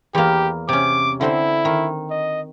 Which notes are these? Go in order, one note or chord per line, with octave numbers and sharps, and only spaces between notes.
E2 A#3 G4
C3 C#4 D6
D3 C4 E4 C5
D#3
D#5